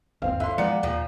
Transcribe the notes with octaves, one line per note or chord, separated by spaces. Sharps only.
G1 D#2 C4 C5 F5
D3 E5 C6
A#2 F3 G#3 B3 D5 C#7
D#2 A#2 F3